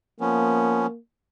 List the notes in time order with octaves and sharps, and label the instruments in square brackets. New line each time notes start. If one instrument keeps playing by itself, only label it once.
[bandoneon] F3 B3 C#4 [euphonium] A#3